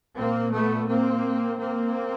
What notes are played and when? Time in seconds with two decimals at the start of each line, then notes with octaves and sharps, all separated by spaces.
0.16 A#2 A#3 C4
0.52 A3 B3
0.87 A#3 C4
1.58 A#3 C4